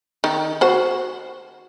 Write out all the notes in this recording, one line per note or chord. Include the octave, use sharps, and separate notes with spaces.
D#3
F#4 C5